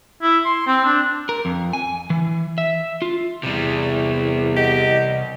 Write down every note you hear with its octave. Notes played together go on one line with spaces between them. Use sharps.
E4
C6
C4
D4
A#4
F2
G#5
E3
E5
F4
E2 C3 G3
G4 D#5 F#5